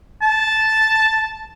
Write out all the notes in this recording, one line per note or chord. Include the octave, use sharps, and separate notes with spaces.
A5